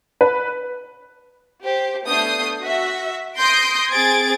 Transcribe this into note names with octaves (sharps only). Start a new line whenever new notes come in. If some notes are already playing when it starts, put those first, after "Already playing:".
B4
G4 C5
A3 B3 D4 D#6 G6 C7
F#4 E5
C6 D#6 G6 A#6 D7
C4 G#4 G#6 A6 D7